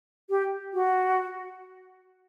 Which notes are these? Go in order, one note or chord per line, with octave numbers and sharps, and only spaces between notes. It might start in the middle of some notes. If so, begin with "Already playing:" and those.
G4
F#4